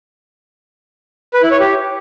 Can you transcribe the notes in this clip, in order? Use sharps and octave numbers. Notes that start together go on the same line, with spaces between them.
B4
E4
C#5
G4